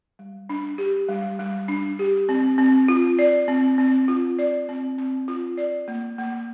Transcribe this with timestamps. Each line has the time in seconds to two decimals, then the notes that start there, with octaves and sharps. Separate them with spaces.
0.19 G3
0.49 D4
0.78 G4
1.09 G3
1.39 G3
1.68 D4
1.99 G4
2.29 C4
2.58 C4
2.88 F4
3.19 D5
3.48 C4
3.78 C4
4.08 F4
4.39 D5
4.69 C4
4.98 C4
5.28 F4
5.57 D5
5.88 A#3
6.18 A#3